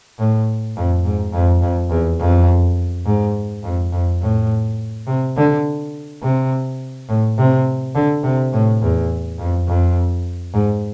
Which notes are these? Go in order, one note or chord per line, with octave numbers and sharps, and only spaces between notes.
A2
F2
G#2
F2
F2
E2
F2
G#2
F2
F2
A2
C3
D3
C3
A2
C3
D3
C3
A2
E2
F2
F2
G#2